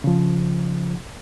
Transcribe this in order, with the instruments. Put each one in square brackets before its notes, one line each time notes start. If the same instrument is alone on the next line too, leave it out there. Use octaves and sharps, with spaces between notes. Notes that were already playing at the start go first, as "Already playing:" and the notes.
[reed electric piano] C#3 F3